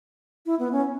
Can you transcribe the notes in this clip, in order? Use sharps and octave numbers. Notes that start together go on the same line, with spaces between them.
E4
B3
C#4